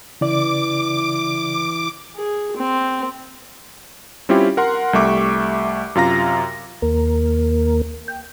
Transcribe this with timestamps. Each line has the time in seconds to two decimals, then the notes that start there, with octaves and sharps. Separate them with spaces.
0.21 C#3 E3 D5 D6
2.16 G#4
2.57 C4
4.29 G3 C4 C#4 E4 F4 G4
4.57 A#4 F#5 C6
4.93 C2 G3 A3 E5 C#6 D6
5.95 F#2 C3 F4 F5 A#5 A#6
6.82 D#2 A#3 A#4
8.08 G5